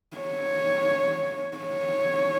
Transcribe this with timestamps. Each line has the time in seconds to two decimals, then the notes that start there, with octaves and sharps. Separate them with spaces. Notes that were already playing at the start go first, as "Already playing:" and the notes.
0.17 C#5
1.57 C#5